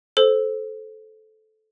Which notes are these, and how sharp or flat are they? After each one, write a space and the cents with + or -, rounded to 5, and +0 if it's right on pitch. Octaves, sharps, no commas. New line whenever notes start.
A4 -15 C5 +0